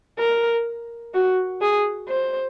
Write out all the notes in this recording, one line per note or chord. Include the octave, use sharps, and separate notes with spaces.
A#4
F#4
G#4
C5